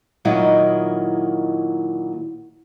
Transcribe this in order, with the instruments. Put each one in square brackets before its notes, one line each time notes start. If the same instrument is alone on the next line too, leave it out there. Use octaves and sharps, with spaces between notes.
[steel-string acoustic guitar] A#2 D#3 F#3 E4 D#5